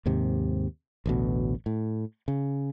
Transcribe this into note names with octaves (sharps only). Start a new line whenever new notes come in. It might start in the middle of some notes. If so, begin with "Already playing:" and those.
D#2 G#2 C3
A1 D2 B2
A2
C#3